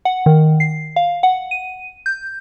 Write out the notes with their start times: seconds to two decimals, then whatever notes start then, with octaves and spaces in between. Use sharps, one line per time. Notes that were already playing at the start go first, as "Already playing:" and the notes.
0.05 F#5
0.26 D#3
0.60 C7
0.96 F5
1.23 F#5
1.51 D#7
2.06 G6